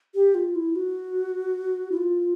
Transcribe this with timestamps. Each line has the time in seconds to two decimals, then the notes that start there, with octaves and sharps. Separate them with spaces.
0.15 G4
0.35 F4
0.55 E4
0.76 F#4
1.91 E4
1.97 F4